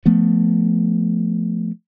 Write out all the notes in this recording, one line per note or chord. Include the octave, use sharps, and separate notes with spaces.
F3 A3 B3